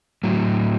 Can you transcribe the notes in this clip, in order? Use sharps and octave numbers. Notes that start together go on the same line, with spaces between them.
A2 F#3